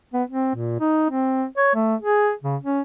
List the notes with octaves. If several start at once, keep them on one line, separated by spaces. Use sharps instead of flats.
B3
C4
A#2
D#4
C4
C#5
A3
G#4
C#3
C#4